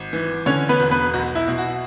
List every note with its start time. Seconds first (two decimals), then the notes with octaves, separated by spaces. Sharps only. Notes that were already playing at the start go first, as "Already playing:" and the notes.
Already playing: G#1
0.13 E3
0.46 D3 C#4 C#5
0.69 B3 B4
0.79 E1
0.91 B3 B4
1.13 B1 F#4
1.35 E4
1.48 B2
1.58 F#4